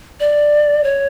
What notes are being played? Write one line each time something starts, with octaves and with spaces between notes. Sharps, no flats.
D5
C#5